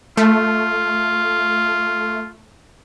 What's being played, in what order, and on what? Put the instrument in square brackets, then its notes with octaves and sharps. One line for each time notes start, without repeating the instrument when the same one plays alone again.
[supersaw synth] A3 [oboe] F4